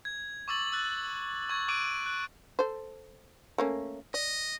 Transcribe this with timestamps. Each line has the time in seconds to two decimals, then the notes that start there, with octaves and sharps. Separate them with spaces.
0.05 G#6
0.48 C#6 D6 E6 A6 F#7
0.72 E6 F#6 A6
1.49 C#6 G#6
1.68 D6 F#6 D7 D#7
2.06 F#6
2.59 A4 C5
3.58 A3 A#3 C#4
4.14 D5 D#5